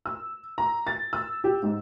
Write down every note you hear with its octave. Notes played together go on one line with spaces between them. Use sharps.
E6
A#5
A6
E6
G4
G#2